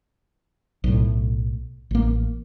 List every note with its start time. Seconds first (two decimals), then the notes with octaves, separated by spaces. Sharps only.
0.84 B1 A2
1.91 A1 A#3